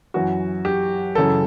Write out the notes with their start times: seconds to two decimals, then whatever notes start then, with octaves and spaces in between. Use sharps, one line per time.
0.14 F#2 E3 F#4
0.65 G4
1.15 F#2 C#3 E3 A4